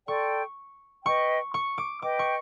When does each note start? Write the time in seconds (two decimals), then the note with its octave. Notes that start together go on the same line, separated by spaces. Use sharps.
0.08 A4 D5 G5 C6 C#6
1.05 B4 D#5 G5 C#6
1.54 C#6
1.78 D6
2.02 B4 D#5 G5 D6
2.19 C#6